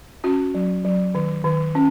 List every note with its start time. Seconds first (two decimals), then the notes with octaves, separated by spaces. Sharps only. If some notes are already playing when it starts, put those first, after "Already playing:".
0.24 C#4 F#4
0.54 F#3
0.85 F#3
1.15 D#3
1.45 D#3
1.75 C#4